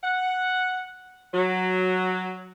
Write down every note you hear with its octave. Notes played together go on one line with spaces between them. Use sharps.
F#5
F#3